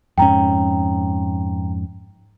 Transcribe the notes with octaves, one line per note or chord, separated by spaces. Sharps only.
F2 G#2 C#4 G5 A#5